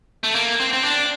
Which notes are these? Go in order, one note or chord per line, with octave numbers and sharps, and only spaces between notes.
A3
A#3
C4
C4
D4